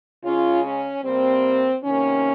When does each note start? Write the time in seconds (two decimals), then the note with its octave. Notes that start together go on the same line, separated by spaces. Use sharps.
0.23 C#3 G#3 C#4 F4
0.64 C#4
1.04 C3 G3 A#3 C4
1.84 C3 D#3 A#3 C#4